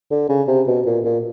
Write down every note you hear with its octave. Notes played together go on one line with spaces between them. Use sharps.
D3
C#3
C3
B2
A#2
A#2